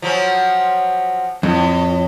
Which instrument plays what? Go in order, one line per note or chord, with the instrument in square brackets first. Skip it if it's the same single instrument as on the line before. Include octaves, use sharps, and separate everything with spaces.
[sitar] F3 F#3 C#4
[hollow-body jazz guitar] F2 [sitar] A2